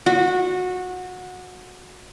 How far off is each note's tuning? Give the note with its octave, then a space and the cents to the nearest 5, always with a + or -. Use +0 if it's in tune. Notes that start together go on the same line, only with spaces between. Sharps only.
F#4 -20